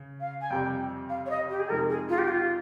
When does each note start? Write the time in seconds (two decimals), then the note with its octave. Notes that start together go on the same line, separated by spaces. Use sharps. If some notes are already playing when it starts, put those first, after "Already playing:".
Already playing: C#3
0.20 F5
0.41 G#5
0.50 F2 C3 G3 G5
1.09 F5
1.26 C#5
1.30 D#5
1.50 G4
1.60 G#4
1.70 F2 C3 F3 G#3 D#4 A#4
1.90 G#4
2.09 F4
2.18 G4
2.28 F4